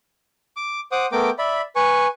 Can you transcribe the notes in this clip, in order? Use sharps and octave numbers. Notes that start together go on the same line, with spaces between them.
D6
C5 F#5 D6 D#6
A3 B3 A#4 G5 D6
D5 E5 B5
B4 G#5 C#6